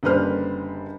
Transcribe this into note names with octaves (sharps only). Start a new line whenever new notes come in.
F#1 D3 G3 B4 C5 F6